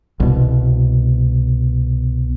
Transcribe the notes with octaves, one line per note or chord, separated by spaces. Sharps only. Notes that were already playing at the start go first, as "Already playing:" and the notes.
C2 B2